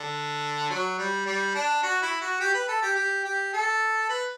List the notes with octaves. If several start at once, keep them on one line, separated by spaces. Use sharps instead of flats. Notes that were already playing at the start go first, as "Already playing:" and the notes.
Already playing: D3
F#3
G3
G3
D4
F#4
E4
F#4
G4
B4
A4
G4
G4
G4
A4
B4